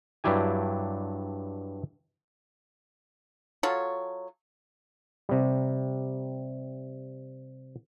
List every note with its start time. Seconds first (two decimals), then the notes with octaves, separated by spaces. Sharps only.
0.24 G2 F#3 D4 E4 G4 G#5
3.63 F#3 F4 A4 C#5
5.29 C3 G3